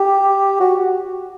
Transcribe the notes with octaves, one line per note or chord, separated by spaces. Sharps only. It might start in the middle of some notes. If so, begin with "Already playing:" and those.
Already playing: G4
F#4